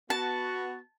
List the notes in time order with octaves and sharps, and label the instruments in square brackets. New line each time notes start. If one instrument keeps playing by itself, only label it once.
[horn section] B3 F#4 [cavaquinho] A5